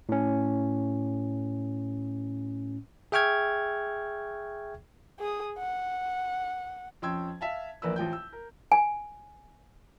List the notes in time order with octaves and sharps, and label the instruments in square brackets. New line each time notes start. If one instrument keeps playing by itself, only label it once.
[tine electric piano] A2 C#4
G#4 E5 G5 C#6 F6 G#6
[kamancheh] G#4 D#6
F#5
[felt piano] F2 C#4 G5 C6 E6 G#6
E5 F5 A5
A#1 E2 A#3 B4 D5 E6
A1 F3 G5 G6
E6
A#4
[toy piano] G#5